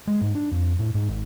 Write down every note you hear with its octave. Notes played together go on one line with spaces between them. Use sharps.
G#3
G#2
D4
F2
A2
G#2
G#1